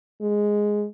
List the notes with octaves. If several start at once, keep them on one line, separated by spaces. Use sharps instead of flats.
G#3